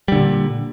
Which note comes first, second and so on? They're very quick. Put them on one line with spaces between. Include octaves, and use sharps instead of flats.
G3 D3 A#2